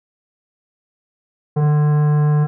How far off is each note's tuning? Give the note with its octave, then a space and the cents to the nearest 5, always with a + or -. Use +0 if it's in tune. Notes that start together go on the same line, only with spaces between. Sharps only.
D3 +30